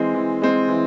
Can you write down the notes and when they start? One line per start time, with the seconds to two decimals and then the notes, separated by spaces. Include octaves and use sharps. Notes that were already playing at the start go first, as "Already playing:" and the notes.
Already playing: E3 G#3 C4
0.14 E3
0.42 G#3 C4
0.69 E3